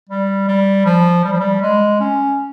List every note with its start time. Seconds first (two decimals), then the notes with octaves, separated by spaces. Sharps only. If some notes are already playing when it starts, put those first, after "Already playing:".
0.09 G3
0.48 G3
0.85 F3
1.24 G3
1.33 F3
1.40 G3
1.62 G#3
2.00 C#4